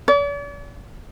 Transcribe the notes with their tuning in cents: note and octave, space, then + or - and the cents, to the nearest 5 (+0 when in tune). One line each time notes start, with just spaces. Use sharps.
D5 -45